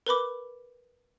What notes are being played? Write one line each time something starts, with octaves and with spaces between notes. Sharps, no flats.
A#4 B4 B5 D6